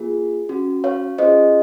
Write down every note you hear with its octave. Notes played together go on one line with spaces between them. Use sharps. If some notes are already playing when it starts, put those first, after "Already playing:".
Already playing: A#3 F4 G#4
C#4 F#4
C#5 F5
C#4 F4 G#4 C5 D#5